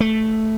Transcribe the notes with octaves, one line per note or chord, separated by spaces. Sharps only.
A3